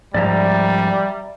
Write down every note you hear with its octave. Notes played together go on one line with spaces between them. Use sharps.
G#2 F3 G3 D5 E5 A#5